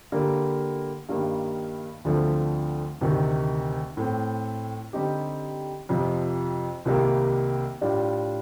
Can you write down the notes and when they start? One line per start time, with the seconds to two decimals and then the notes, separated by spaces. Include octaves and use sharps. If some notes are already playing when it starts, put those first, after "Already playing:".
0.12 D3 G3 A#3
1.09 G2 D#3 G3 A#3
2.05 D2 D3 F3 A3 C4
3.01 D2 C3 D#3
3.97 A2 A3 C4
4.93 D3 G3 C4 D#4 G4
5.89 F2 C3 F3
6.85 C2 C3 D#3 G3 A#3
7.81 A2 G3 D4 F4